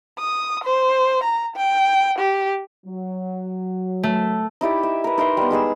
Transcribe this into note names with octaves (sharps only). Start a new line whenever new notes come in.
D#6
C5
A#5
G5
G4
F#3
A3
D#4 E4 G4 D5
E5
A#4 B4
D#4 A#4 E5 C6
G3 B3
G#3 D#4 G#4 E6